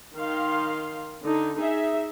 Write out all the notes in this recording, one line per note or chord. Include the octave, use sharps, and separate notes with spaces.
D#3 F5 C6
D3 D#4
D#4 G#4 E5